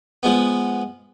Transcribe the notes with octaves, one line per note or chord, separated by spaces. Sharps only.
F3 G#3 B3